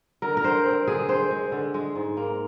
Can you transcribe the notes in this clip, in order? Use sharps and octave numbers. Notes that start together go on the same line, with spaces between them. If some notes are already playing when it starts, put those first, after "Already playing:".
D3 A#4
A#4
D3 C5
C4
D3 G#4
C4 C5
G#3
D3
G#3
G#2
A#3